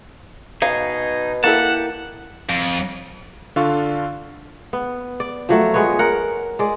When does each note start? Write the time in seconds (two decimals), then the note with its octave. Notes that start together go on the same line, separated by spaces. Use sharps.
0.62 B2 D#4 G#4 F5
1.44 A#3 E4 G4 A4 F#5 A5
2.49 F2
3.56 D3 D4 F4 A4 F5 C#6
4.73 B3
5.20 D5
5.49 F3 F#3 A3
5.74 G#3 B3 B4 C#5
5.99 A#4 F#5
6.59 G#3 D5